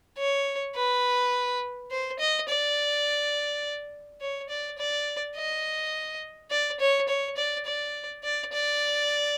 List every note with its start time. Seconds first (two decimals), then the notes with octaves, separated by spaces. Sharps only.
0.18 C#5
0.76 B4
1.91 C5
2.20 D#5
2.49 D5
4.21 C#5
4.49 D5
4.78 D5
5.36 D#5
6.50 D5
6.80 C#5
7.09 C#5
7.37 D5
7.66 D5
8.24 D5
8.53 D5